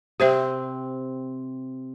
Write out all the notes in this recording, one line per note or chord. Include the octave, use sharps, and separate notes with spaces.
C3 C4 G4 C5 E5